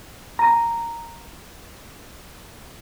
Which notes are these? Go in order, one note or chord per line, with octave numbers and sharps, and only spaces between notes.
G#5 A#5